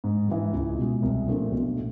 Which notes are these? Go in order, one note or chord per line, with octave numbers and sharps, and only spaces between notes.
G#2
E3 G#3
C#2
B2 G#3
C2
A#2 F3 A3 D4
B1
A2